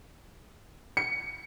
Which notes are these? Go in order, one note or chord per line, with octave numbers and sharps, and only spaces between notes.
C#7